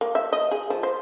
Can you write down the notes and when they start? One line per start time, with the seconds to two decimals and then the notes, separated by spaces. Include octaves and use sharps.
0.01 A#3
0.15 E5
0.33 D#5
0.51 G#4
0.70 F3
0.83 C5